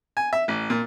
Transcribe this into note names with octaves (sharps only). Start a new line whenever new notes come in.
G#5
E5
A1
A#2